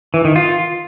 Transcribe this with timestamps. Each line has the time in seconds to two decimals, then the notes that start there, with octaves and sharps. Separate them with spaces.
0.14 E3
0.25 D#3
0.36 F4